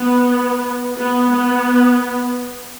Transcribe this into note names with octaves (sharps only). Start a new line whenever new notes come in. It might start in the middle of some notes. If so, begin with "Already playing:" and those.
Already playing: B3
B3
B3